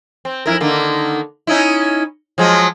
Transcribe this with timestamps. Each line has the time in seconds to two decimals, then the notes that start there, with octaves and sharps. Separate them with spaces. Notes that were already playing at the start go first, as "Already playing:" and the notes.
0.25 C4
0.46 F2 E4 A#4
0.61 D3 D#3 A#3
1.47 C#4 D#4 E4
2.38 F3 F#3 G#3